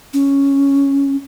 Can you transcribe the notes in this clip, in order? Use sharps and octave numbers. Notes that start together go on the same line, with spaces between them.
C#4